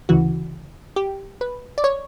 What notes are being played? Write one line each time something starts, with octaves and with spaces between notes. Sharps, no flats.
D2 C#3 E3 F#4
G4
B4
D5
C#5